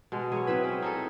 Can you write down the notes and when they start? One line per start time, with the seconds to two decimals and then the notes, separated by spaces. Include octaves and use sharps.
0.12 B2 G#3
0.32 F#3 G#4 C#5
0.47 C4 E4 B4
0.64 C#4
0.82 D#4 G#4 A4